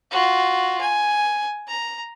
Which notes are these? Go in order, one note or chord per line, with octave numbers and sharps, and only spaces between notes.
F4 F#4
G#5
A#5